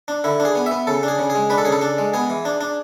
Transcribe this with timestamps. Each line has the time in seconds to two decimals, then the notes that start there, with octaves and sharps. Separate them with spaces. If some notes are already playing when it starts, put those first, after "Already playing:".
0.08 D4
0.24 D3 E4
0.40 D4
0.45 G#4
0.55 B3
0.66 B3 E5
0.87 C#3 A4
1.03 D4
1.08 G#4
1.19 C#3
1.30 G#4
1.35 G#3
1.50 D4 B4
1.58 A4
1.65 C#3 G#4
1.72 A4
1.81 D4
1.98 G#3
2.14 B3 G#4
2.30 E3
2.45 D4
2.61 D4